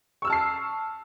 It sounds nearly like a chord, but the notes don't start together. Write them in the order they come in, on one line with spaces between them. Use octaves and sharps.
C#6 E6 F6 A5 C7